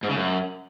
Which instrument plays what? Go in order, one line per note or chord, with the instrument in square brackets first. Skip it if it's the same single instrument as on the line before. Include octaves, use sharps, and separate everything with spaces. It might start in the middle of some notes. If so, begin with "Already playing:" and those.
[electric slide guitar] G#2
C#3
F#2